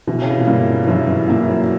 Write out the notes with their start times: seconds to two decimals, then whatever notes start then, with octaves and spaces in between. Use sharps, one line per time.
0.07 B2 E3
0.22 C#3
0.31 B2
0.39 A#2
0.47 G2 A#3 E4
0.87 F#2 E3
1.07 G2
1.28 A#2 A#3 E4
1.48 F#3